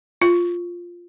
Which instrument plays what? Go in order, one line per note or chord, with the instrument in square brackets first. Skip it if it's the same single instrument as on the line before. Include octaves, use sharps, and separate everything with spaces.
[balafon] F4